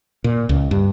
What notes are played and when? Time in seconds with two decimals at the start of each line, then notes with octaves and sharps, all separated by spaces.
0.24 A#2
0.49 C#2
0.71 G2